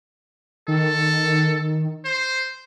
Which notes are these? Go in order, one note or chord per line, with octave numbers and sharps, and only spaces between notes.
D#3 A4
C5